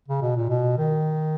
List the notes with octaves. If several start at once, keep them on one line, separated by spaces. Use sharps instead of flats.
C#3
B2
A#2
B2
D#3